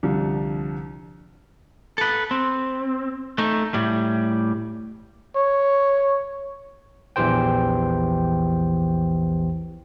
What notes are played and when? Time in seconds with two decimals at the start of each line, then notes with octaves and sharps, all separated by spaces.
0.03 C2 D3 F3
1.98 A4 B4
2.31 C4
3.38 A3 D#4
3.74 A2 G3
5.36 C#5
7.16 A#1 E2 E3 G4 C5 G5